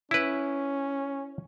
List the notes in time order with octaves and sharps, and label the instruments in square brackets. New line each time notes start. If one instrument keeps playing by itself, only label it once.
[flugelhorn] C#4 [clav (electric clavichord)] E4 B4